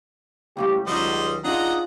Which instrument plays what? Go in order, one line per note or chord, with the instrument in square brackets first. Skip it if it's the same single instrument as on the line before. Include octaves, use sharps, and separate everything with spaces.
[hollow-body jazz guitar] C#2 A2 G3 [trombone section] G4
[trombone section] C#2 [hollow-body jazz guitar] D#3 F#3 [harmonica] G3 C5 D#5
[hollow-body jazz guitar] D4 D#4 G#4 [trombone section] F4 [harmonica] D#5 F#5 A#5